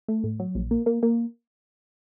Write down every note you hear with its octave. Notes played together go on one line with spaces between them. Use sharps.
A3
A2
F#3
A#1
A#3
A#3
A#3